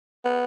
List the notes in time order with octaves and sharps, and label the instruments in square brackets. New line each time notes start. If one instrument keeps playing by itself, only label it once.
[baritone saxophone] B3